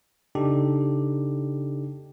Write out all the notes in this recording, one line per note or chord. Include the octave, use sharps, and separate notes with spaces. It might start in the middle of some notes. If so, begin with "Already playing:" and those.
C#3 D4 D#4 G4 A4